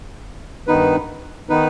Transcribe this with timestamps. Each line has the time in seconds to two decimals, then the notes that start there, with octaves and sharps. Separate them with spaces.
0.67 G2 D#3 B3 D#4 B4
1.49 D#3 B3 D#4 B4